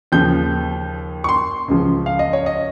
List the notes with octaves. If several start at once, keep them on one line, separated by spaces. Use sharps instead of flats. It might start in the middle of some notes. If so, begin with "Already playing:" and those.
D#2 C#3 F3 G6
C#6
C6
C#2 C#3 F3
F5
D#5
C#5
D#5